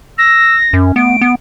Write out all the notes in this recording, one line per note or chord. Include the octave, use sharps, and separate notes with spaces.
E6 A#6
F#2 C#4
A3 B3 D7
B3